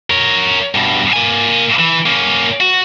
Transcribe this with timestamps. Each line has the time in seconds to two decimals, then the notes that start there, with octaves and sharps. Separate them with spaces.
0.10 A#4 C#5
0.75 G2 B2
1.13 A#3 G#5
1.79 E3
2.06 A#3 C#4
2.60 F#4